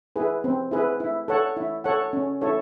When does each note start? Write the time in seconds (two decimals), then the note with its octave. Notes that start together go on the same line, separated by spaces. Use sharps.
0.16 E4 G#4 B4
0.44 C4
0.71 E4 G#4 B4
1.00 E4
1.28 A4 C#5 F#5
1.57 E4
1.84 A4 C#5 F#5
2.13 C#4
2.41 E4 A4 C#5